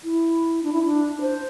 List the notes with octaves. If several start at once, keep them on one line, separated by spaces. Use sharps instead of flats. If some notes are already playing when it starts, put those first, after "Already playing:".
E4
D4
E4
D4
C5